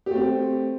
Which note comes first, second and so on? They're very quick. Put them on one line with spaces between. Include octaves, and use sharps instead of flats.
G4 A3 C4